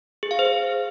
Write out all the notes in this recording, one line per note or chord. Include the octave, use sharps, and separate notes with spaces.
G#4
F5
C5